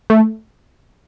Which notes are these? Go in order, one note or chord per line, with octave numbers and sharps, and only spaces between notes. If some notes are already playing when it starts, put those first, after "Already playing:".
A3